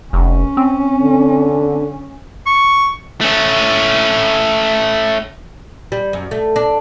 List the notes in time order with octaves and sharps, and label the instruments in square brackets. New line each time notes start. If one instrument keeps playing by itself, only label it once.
[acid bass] F1 [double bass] C#4
[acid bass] C4
[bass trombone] D3
[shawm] C#6
[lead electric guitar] A3 C#4
[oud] G3
F#2
A3
D4